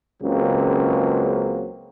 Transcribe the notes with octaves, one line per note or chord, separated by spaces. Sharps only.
C#2 C#3 F#3 A#3 C4